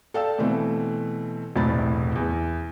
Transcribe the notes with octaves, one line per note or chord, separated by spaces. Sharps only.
A4 D5 F5 G5 A5 E6
B2 E3 A3 C4
E1 C2 A2 C4 B5 A6
E2